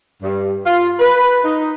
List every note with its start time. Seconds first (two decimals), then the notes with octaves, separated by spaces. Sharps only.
0.22 G2
0.65 F4
0.99 B4
1.44 D#4